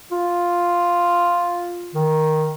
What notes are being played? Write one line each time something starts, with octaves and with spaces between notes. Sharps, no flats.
F4
D#3